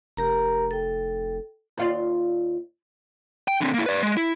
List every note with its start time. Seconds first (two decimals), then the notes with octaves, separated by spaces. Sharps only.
0.17 F1 G4 A#4 A#5
0.71 A4 G5
1.78 D#2 F4 D5
3.48 G5
3.61 D3 C4
3.74 A#3 E4
3.86 B4 D5
4.03 G#3
4.17 E4